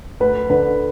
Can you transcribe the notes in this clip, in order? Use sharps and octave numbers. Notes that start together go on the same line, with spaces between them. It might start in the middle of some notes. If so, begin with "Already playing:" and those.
D2 B4
D3 B4